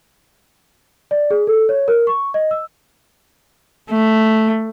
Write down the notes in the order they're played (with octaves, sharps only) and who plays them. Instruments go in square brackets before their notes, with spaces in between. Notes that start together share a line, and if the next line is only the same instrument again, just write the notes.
[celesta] D5
G#4
A4
C#5
A#4
C#6
D#5
E6
[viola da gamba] A3